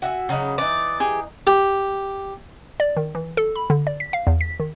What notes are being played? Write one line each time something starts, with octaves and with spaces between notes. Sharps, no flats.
F#4 E5 G#5
C#3 F#3 D#4
E3 D#4 D5
G4 G#4
G4
D5
D#3
E3
A4
B5
D3
D5
B6
F5
E2
B6
D#3